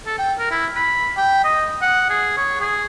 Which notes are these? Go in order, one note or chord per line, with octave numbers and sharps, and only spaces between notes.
A4
G5
A#4
E4
B5
G5
D#5
F#5
G#4
C#5
G#4